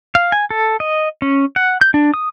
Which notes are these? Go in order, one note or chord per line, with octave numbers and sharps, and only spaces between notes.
F5
G#5
A4
D#5
C#4
F#5
G6
D4
D#6